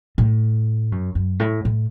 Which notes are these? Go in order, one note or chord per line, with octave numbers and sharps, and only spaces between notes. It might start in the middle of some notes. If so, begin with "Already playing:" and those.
A2
F#2
F#2
A2
A2